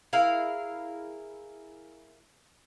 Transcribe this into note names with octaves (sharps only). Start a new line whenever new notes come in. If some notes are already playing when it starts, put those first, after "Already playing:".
E4 G#4 A#4 F5